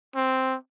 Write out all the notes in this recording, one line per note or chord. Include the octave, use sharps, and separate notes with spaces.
C4